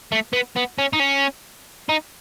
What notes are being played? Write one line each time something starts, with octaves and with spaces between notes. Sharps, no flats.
A3
B3
B3
C#4
D#4
C#4
D#4